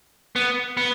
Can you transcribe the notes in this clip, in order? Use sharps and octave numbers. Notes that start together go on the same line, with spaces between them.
B3
B3